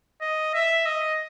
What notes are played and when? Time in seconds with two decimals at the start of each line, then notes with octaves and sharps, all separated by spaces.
0.22 D#5
0.54 E5
0.86 D#5